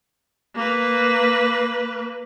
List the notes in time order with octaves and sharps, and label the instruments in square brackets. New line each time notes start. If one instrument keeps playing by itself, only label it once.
[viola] A#3 B4